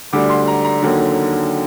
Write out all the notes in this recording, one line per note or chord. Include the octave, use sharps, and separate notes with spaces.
D2 D3 G3 D6
C6
A#5
A#5
D#2 D3 F#3